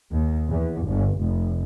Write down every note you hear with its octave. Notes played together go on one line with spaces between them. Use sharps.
D#2
E2
G1
F1